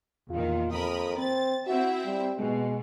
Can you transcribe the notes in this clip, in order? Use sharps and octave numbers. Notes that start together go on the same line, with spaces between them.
E2 A#2 D#3 F4
F2 A#4 B5 D#6
C4 A6
C4 E4 F#4 E5
G3
B2 G#3